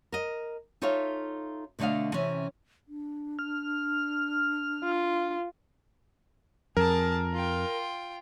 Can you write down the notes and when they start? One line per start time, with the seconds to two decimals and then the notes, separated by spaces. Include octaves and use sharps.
0.12 A#4 D#5
0.82 D#4 F4 A4 C#5 E5 F5
1.79 B2 D3 A3 D4 D#5 F5
2.13 C3 E3 C#4
2.88 D4
3.39 F6
4.84 F4
6.77 F2 G#4 A#4 A5
7.33 F4 G5